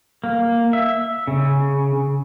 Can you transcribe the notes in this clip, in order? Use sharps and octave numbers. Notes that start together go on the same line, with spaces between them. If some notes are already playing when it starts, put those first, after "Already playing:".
A#3
E5
C#3